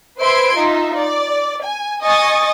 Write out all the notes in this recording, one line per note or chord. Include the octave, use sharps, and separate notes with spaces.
B4 C5 E5 C6 G#6 D7
D#4 F4 E5
D5
G#5
D#5 G#5 C#6 D#6 A6